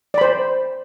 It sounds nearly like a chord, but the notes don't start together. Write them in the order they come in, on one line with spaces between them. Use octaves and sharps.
D5 B5 C5